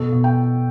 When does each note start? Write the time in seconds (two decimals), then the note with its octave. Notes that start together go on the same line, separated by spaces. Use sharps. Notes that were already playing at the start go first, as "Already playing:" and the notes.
Already playing: B2 A4
0.12 B2
0.24 G5